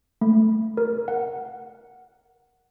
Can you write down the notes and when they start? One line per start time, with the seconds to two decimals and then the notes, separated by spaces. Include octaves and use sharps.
0.21 A3
0.77 A#4
1.08 F#5